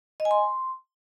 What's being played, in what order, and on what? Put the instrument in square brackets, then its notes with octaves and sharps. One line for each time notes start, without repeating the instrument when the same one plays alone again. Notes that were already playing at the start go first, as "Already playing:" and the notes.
[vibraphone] D#5
G#5
C6